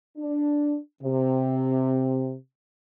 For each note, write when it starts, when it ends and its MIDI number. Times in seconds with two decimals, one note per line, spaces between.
0.17 0.77 62
1.03 2.35 48